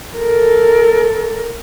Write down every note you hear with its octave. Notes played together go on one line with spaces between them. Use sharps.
A4 A#4